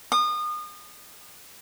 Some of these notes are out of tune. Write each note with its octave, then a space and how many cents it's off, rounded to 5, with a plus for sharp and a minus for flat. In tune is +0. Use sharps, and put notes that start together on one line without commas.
D#6 -30